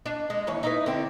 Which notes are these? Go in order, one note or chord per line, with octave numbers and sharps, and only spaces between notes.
D4
G#3
D#2 E3 C#5
D#4 E4 B4
D3 C4